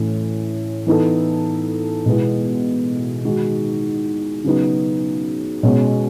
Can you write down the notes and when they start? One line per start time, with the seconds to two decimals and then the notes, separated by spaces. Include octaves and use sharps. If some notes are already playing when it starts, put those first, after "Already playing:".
Already playing: A2 E3 A3 C#4
0.87 E3 B3 D#4 A4
2.06 B2 G#3 B3 E4
3.25 D#3 G#3 D#4 F#4
4.44 C#3 F#3 B3 D#4
5.63 B2 G#3 C#4 F#4